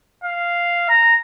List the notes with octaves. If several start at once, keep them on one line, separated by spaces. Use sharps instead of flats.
F5
A#5